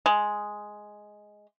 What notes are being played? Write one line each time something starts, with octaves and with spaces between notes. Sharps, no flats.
G#3